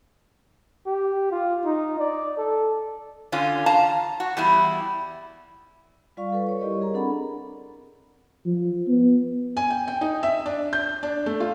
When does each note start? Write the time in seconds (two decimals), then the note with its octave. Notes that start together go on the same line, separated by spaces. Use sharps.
0.86 G4
1.31 F4
1.65 D#4
2.00 D5
2.38 A4
3.32 D3 C#4 F4
3.66 F5 A5 A#5
4.20 F#4
4.37 E2 G3 E4
6.17 G3 F4 D5 F5 C#6
6.32 A4 B4
6.47 C#5 C#6
6.61 G3 E4 G4 A#4 D5 D#5
6.81 G#4 A#4 A#5
6.94 C4 D4 A4 F#5 B5
8.46 F3
8.88 B3
9.57 G#5
9.70 G5
9.88 G5
10.01 D#4
10.23 E5
10.46 D4
10.73 G6
11.03 D4
11.26 A3
11.40 F4